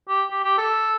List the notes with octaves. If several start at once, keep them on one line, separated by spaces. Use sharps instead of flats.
G4
G4
G4
A4